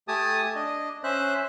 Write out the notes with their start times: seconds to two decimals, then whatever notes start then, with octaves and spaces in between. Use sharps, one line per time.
0.08 A3 G4 G#5 A5 D#6
0.55 D4 D#5
1.04 C#4 C5 E5 F#6